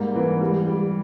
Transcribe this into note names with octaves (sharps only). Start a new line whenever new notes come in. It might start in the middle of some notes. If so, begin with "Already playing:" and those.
Already playing: G#2 G3 A#3
E3
G3
G3